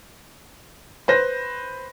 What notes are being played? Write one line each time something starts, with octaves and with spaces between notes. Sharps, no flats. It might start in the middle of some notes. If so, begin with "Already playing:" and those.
B4 C5 A#6